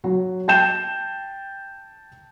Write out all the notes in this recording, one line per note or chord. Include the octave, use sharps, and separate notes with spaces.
F#3
G5 A5 G6 E7